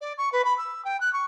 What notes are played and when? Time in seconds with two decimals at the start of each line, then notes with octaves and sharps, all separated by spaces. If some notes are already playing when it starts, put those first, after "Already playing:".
0.01 D5
0.17 C#6
0.32 B4
0.44 B5
0.58 E6
0.84 G5
1.00 F#6
1.13 C#6